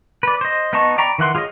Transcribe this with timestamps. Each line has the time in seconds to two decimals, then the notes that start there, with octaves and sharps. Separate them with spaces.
0.23 B4 D5
0.41 C5 D#5
0.73 B3 D#4 D#5 A5 C#6
0.98 D5 G5 A#5 B5 C#6
1.18 D#3 E3 F#5 C6
1.35 F4 G#4 C#5 D#5